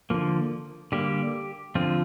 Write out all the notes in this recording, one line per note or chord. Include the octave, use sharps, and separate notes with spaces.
D3 F3 A#3
D3 G3 A#3 G4
D3 F3 C4 F4